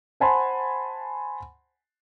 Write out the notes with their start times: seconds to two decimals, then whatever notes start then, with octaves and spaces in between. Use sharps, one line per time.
0.20 C5 F#5 G#5 A5 B5 C6